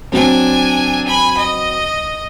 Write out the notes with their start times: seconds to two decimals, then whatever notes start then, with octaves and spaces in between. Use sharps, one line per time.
0.12 F#3 C4 D4 G#5
1.07 G#5 B5
1.37 D#5